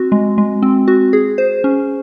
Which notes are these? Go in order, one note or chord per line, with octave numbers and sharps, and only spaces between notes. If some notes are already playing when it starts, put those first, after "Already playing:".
Already playing: C4 F#4
G#3
G#3
C4
F#4
G#4
C5
C#4